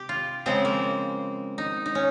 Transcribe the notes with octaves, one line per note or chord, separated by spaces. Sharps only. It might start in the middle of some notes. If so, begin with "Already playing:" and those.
Already playing: C3 G4
F4
C#3 F3 G#3 C4
A#3
D#4
D#4
C#4